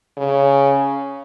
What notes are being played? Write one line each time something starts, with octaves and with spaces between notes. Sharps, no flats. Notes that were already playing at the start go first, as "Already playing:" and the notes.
C#3